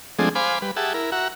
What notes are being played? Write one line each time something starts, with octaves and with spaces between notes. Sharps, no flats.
F3 G#3 A3 C4 D4 G#4
C5 F5 G#5 B5 D6
G3 B4
G4 G#4 E5 F#5 A5
E4 A#4
F#4 E5 F#5 A#5